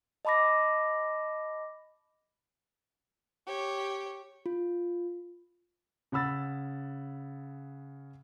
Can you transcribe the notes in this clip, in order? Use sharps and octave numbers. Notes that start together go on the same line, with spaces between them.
D#5 A5 B5 D6 A#6
G4 C#5
F4
C#3 F#5 B5 E6 A6